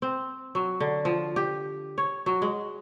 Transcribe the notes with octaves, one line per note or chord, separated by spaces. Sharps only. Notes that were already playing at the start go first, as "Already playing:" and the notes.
C4
F#3
D3
F3
G4
C#5
F#3
G#3